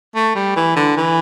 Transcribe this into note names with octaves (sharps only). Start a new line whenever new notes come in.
A3
G3
E3
D3
E3